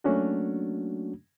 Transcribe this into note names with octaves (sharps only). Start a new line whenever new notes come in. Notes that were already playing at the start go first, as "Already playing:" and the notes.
F#3 A3 A#3 C#4 D4 F#4